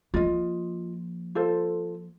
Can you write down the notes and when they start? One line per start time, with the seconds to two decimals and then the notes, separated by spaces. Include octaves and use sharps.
0.14 F3 A#3 F4 D#5
1.35 F4 A4 C5